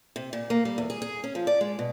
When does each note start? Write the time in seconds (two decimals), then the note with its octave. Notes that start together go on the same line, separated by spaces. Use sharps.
0.16 C3
0.33 A#2
0.50 A#3
0.65 G3
0.78 E2
0.90 G#4
1.02 G#4
1.24 C#4
1.35 F3
1.47 D5
1.61 G#3
1.79 B2